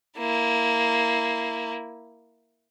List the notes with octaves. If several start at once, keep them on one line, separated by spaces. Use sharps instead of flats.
A#3 E4